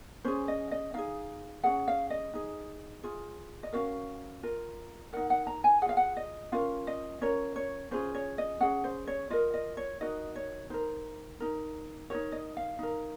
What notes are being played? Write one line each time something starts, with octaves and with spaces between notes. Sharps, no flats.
C#4 G#4 C5
D#5
D#5
D#4 G#4 F5
C#4 G#4 F#5
F5
D#5
D#4 G#4
F4 G#4
D#5
C#4 F#4 A#4 F5
F4 A#4
D#4 A#4 F#5
F#5
A#5
G#5
F4 G#4 F5 F#5
F#5
D#5
C#4 F4 A#4 F5
D#5
C#4 F4 A#4 C#5
C#5
C#4 F4 G#4 C5
C#5
D#5
C#4 G#4 F#5
C5
C#5
F4 A#4 D#5
D#5
C#5
D#4 F#4 A#4 D#5
C#5
D#4 A#4 C5
D#4 A#4
D#4 F#4 A#4 C#5
D#5
F5
D#4 A#4